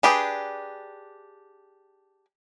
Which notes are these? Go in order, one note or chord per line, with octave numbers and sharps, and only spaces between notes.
D4 G4 G#4 B4